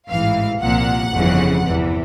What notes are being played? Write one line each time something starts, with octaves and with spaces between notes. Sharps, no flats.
A1 G#2 E3 F5
C2 A#2 F3 F#5
G1 F2 C#3 E3
E2 C3 E3